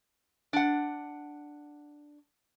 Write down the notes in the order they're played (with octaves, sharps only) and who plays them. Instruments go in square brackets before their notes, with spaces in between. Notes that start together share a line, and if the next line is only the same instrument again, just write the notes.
[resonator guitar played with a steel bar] D4 F#5